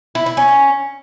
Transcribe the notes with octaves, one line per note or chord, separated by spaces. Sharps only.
E4
E4
C#4